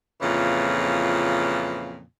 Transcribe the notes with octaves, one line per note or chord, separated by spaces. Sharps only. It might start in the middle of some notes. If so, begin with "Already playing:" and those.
F2 A#2 C#3 E3